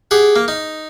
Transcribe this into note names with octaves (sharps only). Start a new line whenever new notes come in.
G4 G#4 F#5
A#3
D#4